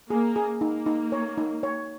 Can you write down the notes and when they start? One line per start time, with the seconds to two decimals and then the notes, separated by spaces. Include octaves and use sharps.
0.10 A#3 G#4
0.36 G#4
0.61 A#3 D#4
0.86 D#4
1.12 C#5
1.38 D#4
1.63 C#5